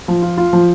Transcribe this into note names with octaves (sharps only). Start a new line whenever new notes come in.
F3
F4
F4
F3